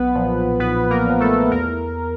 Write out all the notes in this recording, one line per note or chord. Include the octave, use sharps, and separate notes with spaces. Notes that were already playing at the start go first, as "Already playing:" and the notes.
Already playing: B1 B3 B4
A#2 F3
B1 B3 B4
A#3 A#4
A#2 F3
A3 A4
E2 A#4